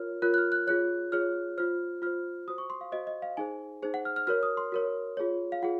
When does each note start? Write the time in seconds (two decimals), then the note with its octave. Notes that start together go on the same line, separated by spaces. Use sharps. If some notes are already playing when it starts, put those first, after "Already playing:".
Already playing: F4 A#4 C#5 F6
0.22 F4 A#4 C#5 F#6
0.34 F#6
0.38 F6
0.52 F#6
0.67 F4 G#4 C#5 F#6
1.12 F4 G#4 C#5 F6
1.58 F4 C5 F6
2.02 F4 C5 F6
2.48 F#4 C5 D#6
2.58 C#6
2.70 C6
2.81 F5
2.92 F#4 C5 D#5
3.07 D#5
3.22 F5
3.37 D#4 G#4 C5 G#5
3.83 D#4 G#4 C5
3.94 F#5
4.05 F6
4.16 F6
4.27 F#4 A#4 C#5 F6
4.43 D#6
4.57 C6
4.72 F#4 A#4 C#5
5.17 F4 G#4 C#5
5.52 F5
5.62 F4 G#4 F#5